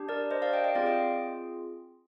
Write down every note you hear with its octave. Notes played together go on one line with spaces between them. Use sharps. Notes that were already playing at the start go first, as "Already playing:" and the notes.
Already playing: D4 G4
A#4 D5
C5 D#5
D5 F5
D#5 G5
D#5 G5
C4 F4 G#4 D5 F5
D#5 G5